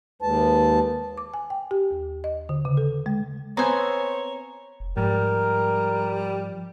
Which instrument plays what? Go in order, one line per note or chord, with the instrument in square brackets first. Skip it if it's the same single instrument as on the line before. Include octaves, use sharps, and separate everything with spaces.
[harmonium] D#2 A5 [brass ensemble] G#3 B4
[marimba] D6
G#5
G5
G4
D#2
D#5
D3
C#3
A4
G#3
[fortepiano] B3 C5 [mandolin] C4 G#5 [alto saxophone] C#5 [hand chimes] A#5
[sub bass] F1
[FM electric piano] G#2 [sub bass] F3 [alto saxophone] G3 [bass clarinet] A#4